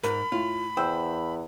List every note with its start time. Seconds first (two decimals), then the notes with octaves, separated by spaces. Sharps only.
0.03 G#2 A#4 B5
0.32 A2 F4
0.77 E2 C5 G5 E6